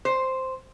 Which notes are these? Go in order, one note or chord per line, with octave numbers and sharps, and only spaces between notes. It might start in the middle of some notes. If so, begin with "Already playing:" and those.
C5